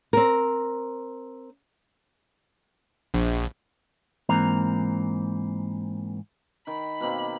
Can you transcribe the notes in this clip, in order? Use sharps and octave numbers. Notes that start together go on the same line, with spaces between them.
C4 A#4
A#1
G#2 E3 A#3 C4 A#5
D#3 B5
B2 A#3 C4